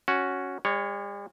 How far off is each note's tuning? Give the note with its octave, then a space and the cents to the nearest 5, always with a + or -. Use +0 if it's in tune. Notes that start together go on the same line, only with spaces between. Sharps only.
C#4 +0 F#4 +0
G3 +45 C#5 +0